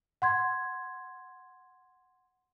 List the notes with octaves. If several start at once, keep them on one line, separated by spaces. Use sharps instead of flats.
F#5 C6 G#6